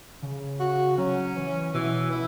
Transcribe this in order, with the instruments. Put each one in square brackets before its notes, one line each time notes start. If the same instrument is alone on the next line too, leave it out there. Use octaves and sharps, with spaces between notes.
[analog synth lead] C#3
[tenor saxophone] F#4
[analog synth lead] F#3 [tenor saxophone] C#4
[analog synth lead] E3
[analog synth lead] B2 [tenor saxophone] E3
[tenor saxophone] E4